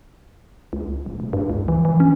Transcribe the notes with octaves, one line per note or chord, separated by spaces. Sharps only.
C#2
D#1
F1
G2
C#2
E3
E3
C#4